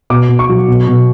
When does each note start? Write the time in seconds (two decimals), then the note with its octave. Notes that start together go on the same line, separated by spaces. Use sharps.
0.10 B2 D6
0.29 B2
0.39 C#6
0.49 F#3
0.68 B2
0.87 B2